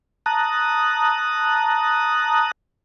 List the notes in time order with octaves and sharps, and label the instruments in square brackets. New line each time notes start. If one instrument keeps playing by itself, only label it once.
[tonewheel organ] A5 A#5 D#6 F#6